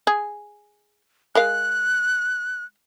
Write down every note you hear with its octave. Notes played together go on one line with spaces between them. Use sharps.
G#4
G#3 A#4 F5 F#6